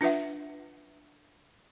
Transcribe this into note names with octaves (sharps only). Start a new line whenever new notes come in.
D4 F4 B4 E5 F#5